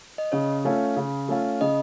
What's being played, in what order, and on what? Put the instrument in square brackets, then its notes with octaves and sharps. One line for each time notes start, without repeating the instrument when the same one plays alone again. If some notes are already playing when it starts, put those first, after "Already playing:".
[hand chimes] D#5
[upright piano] C#3 [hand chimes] C#5
[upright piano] A3 C#4 F4
C#3
A3 C#4 F4
[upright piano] C#3 [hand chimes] D#5